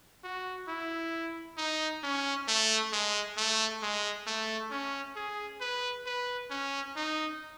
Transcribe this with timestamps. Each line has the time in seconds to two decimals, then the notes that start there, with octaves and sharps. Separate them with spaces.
0.24 F#4
0.68 E4
1.57 D#4
2.03 C#4
2.48 A3
2.93 G#3
3.37 A3
3.82 G#3
4.26 A3
4.71 C#4
5.16 G#4
5.61 B4
6.06 B4
6.50 C#4
6.96 D#4